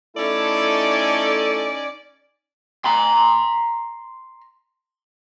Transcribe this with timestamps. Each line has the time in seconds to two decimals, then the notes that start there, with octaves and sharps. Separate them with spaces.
0.17 A3 C#4 D#4 E4 A4 D5 G#5
2.85 A#5 C6